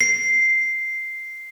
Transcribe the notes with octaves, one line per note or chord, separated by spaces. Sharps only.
C7